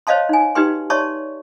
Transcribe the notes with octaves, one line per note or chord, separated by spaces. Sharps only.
C5 C#5 D#5 F5 A5 C6
D#4 G#5
D#4 F#4 G4 B4 G5 C6
C#5 D5 E5 A5 C6 C#6